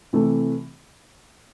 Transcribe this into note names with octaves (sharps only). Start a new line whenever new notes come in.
C3 E3 A3